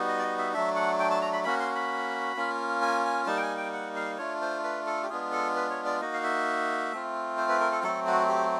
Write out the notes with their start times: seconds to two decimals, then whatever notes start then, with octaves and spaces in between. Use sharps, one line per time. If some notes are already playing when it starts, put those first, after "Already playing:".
Already playing: G3 B3 D#4 F#4
0.08 D#5
0.19 D5
0.23 D#5
0.38 E5
0.54 F#3 A3 D4 E5
0.76 F#5
1.00 G5
1.11 A5
1.22 A#5
1.33 B5
1.44 A#3 C#4 F#4 B5
1.60 C6
1.76 B5
2.36 A#3 C#4 F4
2.82 G#5
3.05 G#5
3.27 G3 A#3 D#4 A5
3.37 G5
3.42 G#5
3.57 G5
3.73 F#5
3.96 F5
4.18 A3 D4 F4 C#5
4.42 C5
4.64 B4
4.86 A4
5.03 G4
5.10 G#3 B3 D4 F4 G#4
5.32 A4
5.56 B4
5.70 C#5
5.85 D5
6.01 A#3 D#4 F#4 D#5
6.14 F5
6.23 E5
6.92 A3 C4 F4
7.38 C5
7.49 B4
7.60 A#4
7.72 A4
7.83 F#3 A3 C4 A4
8.07 F#4
8.28 G4